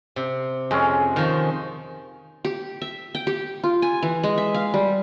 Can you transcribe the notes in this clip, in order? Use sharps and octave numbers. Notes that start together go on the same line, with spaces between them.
C3
F2 G#3 C#4
D#3 F3
G4
E5
G5
G4
F4
G#5
E3
G#3
E5
F5
G3